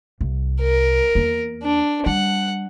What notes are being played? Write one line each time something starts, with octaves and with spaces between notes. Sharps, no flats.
C2
A#4
E2 A#3
D4
G3 F#5